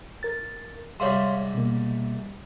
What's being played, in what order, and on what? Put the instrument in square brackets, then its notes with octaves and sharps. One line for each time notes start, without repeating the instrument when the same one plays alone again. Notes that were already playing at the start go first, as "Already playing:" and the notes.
[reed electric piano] A#4 A6
[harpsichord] G#2 C3 G3 [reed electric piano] C#5 F5 C6
[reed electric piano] B2 A#3